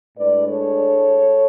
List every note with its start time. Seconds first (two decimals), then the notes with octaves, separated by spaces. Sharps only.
0.17 A2 G#3 D4 B4 D5
0.46 A4 C#5